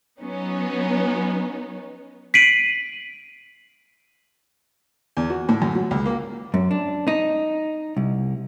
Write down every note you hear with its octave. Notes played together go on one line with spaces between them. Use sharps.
F#3 B3 C#4 D#4
B6 C7 D7 D#7 F#7
E2
F#4
A2
F#2
F#3
C#2
A#3
F#2
D4
D#4
C2